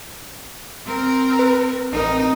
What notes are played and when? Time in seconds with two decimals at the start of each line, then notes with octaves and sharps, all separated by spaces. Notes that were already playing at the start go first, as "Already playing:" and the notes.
0.86 C4 A#4
1.39 B4
1.92 A1 C4 D#4 A#4